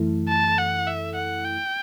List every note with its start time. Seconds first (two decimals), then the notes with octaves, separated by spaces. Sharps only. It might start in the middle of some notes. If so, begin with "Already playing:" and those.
Already playing: F#2 E3 A3 E4 A4
0.28 A5
0.58 F#5
0.87 E5
1.15 F#5
1.45 G5